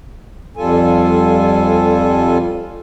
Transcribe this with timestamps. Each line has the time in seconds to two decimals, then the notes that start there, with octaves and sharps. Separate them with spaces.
0.57 F2 G3 F4 A4 G#5